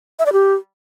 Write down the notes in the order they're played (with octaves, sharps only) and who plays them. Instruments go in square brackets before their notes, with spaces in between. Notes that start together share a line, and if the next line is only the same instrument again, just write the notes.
[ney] E5
D5
G4